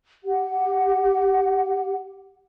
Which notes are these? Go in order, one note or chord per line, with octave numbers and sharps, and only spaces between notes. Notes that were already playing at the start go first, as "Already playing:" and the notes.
G4 F#5